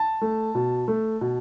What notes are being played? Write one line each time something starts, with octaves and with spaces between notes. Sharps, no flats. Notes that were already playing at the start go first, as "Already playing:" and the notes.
Already playing: A5
A3
B2
A3
B2